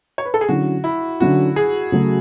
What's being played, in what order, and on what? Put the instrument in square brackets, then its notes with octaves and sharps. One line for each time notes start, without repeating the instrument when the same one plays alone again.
[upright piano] C#5
B4
A4
G#4
[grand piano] D3 F#3 C#4 E4 [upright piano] F#4
[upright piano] E4
[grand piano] D3 F#3 C#4 E4 [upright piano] F#4
[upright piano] G#4
[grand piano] C#3 F#3 A3